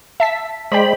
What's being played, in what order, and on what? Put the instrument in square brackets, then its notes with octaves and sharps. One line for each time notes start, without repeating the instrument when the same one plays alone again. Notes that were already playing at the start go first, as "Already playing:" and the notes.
[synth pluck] E5 A5 B6
[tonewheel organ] G#3 B5 [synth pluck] C5 D5 G5